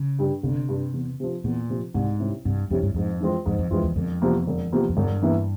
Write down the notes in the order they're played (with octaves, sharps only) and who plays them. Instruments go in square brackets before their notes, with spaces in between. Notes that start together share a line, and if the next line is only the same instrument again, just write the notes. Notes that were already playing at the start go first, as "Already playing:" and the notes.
Already playing: [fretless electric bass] C#3
[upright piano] G2 G3
[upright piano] G1 [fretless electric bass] C3
[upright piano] G2 G3
E2
C3 F3
[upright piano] E2 [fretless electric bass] A#2
[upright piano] C3 F3
[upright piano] C2 [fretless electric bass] G#2
[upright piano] C3 G3 C#4 E4
[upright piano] C2 [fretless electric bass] G2
[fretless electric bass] F2 [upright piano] C3 G3 C#4 E4
[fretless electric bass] G2
[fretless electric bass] F2 [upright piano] G#2
[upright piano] E3 G#3 C4 F4
[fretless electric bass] F2 [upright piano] G#2
[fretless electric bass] F2
[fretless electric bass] F2 [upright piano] E3 G#3 C4 F4
[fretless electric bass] E2
[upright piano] E1 [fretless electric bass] F2
[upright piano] E2 C3 F3 A#3
E1
E2 C3 F3 A#3
[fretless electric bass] F2
[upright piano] E1 [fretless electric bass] G2
[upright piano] E2 E3 A#3 E4